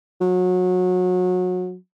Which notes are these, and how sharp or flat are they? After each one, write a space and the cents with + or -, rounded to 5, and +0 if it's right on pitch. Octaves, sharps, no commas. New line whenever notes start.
F#3 -25